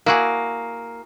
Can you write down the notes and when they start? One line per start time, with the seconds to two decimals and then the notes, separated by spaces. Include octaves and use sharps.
0.06 A#3 E4 F#4 G#4